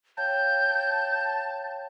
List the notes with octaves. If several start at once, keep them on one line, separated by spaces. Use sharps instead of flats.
C#5 F5 G5 A5 G6